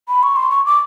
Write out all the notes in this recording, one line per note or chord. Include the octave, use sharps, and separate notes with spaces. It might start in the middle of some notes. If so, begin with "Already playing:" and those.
B5
C#6
C6
C#6
D6